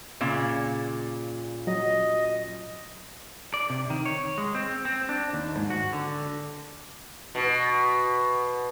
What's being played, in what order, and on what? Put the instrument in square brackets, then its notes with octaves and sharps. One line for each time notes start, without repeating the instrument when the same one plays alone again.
[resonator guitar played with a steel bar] A#2 C#3
[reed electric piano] F#3 [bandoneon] D#5
[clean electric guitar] D5
C3
D#3
C#5
G#3
C4
C4
D4
D#2
G#2
F#4
D3
[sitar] B2